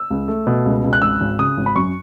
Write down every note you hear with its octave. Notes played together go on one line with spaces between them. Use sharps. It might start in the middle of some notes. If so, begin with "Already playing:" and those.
Already playing: E6
C#2
A3
B2
C#2
C#2
F#6
G#1 E6
G#1
C#3 D#6
G#1
B5
F#2 C#6